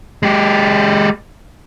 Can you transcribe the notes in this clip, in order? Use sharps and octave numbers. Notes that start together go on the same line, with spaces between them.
G#3 G4